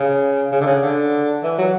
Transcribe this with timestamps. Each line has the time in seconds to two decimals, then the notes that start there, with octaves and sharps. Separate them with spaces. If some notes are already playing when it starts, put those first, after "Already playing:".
Already playing: C#3
0.52 C#3
0.61 D3
0.66 C#3
0.82 D3
1.43 E3
1.58 F#3